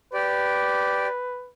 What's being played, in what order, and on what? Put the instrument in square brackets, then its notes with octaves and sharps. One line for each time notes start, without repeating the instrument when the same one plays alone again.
[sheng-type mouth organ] G4 D5 [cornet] B4